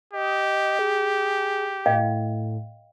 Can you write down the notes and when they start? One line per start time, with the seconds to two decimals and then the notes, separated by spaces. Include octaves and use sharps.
0.13 G4 D#5
0.79 G#4
1.86 A2 D#5 F5 G5